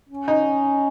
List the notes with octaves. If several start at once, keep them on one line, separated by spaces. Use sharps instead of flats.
C#4
D#4